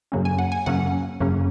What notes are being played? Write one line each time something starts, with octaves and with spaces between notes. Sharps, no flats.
F#2 C#3 F#3 A#3 C#4
G#5
F#5
G#5
F#2 C#3 F#3 A#3 C#4 F#5
F#2 C#3 F#3 A#3 C#4